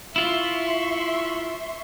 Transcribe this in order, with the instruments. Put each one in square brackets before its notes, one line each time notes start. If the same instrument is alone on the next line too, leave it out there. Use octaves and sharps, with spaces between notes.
[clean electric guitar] E4 F4 [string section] E5 C6 C#6